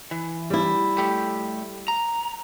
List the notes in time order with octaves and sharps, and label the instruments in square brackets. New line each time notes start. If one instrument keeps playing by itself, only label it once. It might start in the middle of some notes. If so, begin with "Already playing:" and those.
[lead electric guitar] E3
[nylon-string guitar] G3 E4
[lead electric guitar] A3 G4
A#5